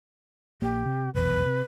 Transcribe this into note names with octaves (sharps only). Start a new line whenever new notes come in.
A#1 A#3 G4
C3
F1 B1 E2 B4
C3